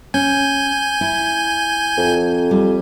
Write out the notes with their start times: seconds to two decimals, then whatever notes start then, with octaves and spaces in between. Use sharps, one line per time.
0.14 C#4 G#5 G6
1.01 E4
1.98 F2
2.51 G3